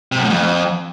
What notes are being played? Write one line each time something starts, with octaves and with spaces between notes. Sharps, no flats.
C3
F#2
A2
F2